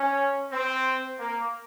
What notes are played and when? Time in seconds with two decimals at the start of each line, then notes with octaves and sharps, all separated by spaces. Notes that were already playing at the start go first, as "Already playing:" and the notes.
Already playing: C#4
0.51 C4
1.18 A#3